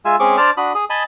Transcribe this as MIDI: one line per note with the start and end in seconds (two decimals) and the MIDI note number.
0.05 0.16 56
0.05 0.16 65
0.05 0.16 76
0.05 0.16 80
0.05 0.16 88
0.20 0.37 56
0.20 0.37 60
0.20 0.37 61
0.20 0.37 68
0.20 0.37 85
0.20 0.37 86
0.37 0.50 62
0.37 0.50 72
0.37 0.50 74
0.37 0.50 81
0.37 0.50 86
0.37 0.50 89
0.57 0.73 62
0.57 0.73 66
0.57 0.73 83
0.57 0.73 87
0.75 0.85 68
0.75 0.85 87
0.90 1.03 75
0.90 1.03 80
0.90 1.03 81
0.90 1.03 83
0.90 1.03 87